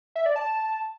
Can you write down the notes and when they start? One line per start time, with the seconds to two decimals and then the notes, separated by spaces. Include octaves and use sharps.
0.16 E5
0.26 D5
0.36 A5